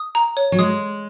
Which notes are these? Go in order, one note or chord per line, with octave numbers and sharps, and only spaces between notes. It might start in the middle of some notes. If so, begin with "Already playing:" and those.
Already playing: D#6
A#5
C#5
F#3
G#3 D#6